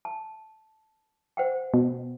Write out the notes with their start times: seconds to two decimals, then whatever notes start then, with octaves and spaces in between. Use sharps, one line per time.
0.05 A5
1.37 C5 F#5 G5
1.74 B2